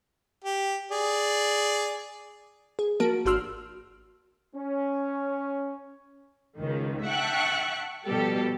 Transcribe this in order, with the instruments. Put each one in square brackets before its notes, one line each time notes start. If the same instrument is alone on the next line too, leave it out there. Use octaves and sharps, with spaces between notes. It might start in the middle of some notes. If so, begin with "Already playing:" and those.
[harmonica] G4
G#4 D5
[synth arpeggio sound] G#4
F3 A#3 F#4 A#4 A5 D7
G#1 D4 F#4 C6 E6 F6
[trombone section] C#4
[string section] C#2 D#3
E5 F#5 G5 A5 C#6 F#6
B2 F3 G3 G4 A4